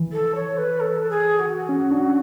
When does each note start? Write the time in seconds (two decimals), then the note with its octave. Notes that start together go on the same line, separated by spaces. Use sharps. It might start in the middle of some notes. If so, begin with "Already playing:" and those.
Already playing: E3
0.12 A4
0.35 C#5
0.57 B4
0.80 A4
1.09 G#4
1.39 F#4
1.69 C#4
1.91 D4